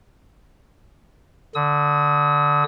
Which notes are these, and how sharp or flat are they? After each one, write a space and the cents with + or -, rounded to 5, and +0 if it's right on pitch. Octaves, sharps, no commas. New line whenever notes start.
D3 +0 D#6 +40